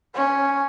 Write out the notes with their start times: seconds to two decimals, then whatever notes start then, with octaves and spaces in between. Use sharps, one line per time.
0.15 C#4